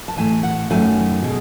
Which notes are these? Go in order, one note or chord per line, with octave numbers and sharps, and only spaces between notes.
A5
A2 E3 A3 G#5
F#5
F#2 D#3 F#3 A3 G#5
B2 G#3